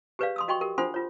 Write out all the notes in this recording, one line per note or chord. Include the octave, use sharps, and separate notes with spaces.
G4 G#4 B4 C#5 D5 F5
C6 D#6 E6
F#4 D#5 G5 C6 C#6
G4 A#4
D4 F4 A4 C5 F#5 C6
F4 C#5